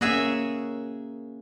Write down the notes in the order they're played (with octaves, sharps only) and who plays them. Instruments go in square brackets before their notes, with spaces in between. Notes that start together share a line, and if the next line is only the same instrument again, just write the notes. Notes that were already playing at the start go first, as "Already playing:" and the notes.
[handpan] A#3 C#4 [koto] F#4 G#4 E5